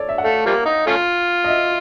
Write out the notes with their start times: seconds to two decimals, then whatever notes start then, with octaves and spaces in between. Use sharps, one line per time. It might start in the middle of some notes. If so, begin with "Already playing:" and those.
Already playing: A4 C#5 D5
0.09 E5
0.18 F#5
0.24 A3 F5
0.46 F3 G3 A#3
0.66 D#4
0.87 A3 C#4 F4
1.44 D#5
1.49 E5